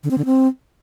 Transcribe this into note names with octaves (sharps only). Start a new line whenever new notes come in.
D3
C4
D3
C4